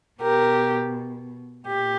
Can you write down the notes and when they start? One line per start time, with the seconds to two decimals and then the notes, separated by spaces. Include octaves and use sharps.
0.21 B2 G4 A#4
1.67 A#2 G4